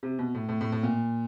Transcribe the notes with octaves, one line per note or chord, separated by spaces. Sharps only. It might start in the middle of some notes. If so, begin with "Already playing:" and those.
C3
B2
A2
A2
A2
A2
A#2